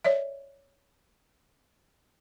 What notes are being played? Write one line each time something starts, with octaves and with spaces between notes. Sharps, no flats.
C#5 D5 E5